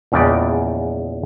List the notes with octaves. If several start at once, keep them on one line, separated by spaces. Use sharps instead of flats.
A#1 E2 C#3 G#3 D5 G5